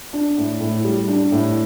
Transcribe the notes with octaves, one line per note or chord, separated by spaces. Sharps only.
D4
A2
A2
G3
D4
A2